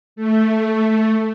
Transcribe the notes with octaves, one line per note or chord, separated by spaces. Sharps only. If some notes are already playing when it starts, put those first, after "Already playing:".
A3